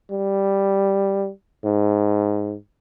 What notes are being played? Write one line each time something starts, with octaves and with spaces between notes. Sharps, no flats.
G3
G#2